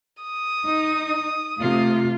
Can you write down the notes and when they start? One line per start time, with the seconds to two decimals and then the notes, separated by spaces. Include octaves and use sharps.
0.23 D#6
0.66 D#4
1.59 C3 A3 F4